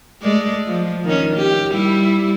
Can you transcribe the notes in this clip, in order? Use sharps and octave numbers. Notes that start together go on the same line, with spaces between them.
G#3 A3 D5
F3
D#3 C#4
G4
G3 E4